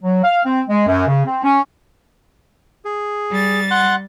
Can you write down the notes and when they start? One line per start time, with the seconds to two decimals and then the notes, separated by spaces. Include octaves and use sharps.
0.02 F#3
0.24 F5
0.45 C4
0.69 G#3
0.87 F#2
1.07 C#3
1.25 C4
1.43 C#4
2.85 G#4
3.31 G3 A6
3.71 F#5 C6 F#6